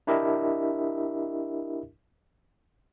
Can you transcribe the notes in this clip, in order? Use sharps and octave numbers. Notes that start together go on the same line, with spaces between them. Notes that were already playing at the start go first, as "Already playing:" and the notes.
D4 E4 G4 A#4 D#5 E5